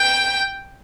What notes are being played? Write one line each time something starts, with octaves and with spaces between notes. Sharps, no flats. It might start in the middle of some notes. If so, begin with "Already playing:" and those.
Already playing: G5